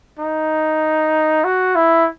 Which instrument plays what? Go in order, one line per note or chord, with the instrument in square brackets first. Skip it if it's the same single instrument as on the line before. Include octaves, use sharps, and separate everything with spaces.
[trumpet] D#4
F#4
E4